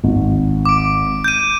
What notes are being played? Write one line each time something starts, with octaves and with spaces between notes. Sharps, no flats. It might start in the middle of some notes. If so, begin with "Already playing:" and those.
G#1
D6 D7
G6 D#7